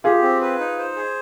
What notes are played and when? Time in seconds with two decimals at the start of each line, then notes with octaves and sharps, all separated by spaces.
0.04 F4 G4 G#4
0.22 C4
0.41 B4
0.59 D#4
0.78 C5
0.96 G#4